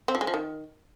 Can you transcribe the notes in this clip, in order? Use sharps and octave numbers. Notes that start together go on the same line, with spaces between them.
C4
F3
G#3
F3
D#3